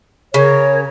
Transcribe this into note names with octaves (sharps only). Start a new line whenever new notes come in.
C#3 A#4 C#5